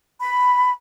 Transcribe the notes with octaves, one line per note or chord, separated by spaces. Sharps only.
B5